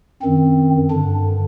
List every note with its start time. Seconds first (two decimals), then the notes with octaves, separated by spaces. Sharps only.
0.22 F#2 D#3 C4
0.90 G2 D3 D4